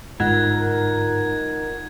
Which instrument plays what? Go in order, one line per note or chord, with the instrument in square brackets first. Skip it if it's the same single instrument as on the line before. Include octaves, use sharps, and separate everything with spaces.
[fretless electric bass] G1 G#2 [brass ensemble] D#4 A#4 [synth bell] F4 F#5 F#6 [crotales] G#6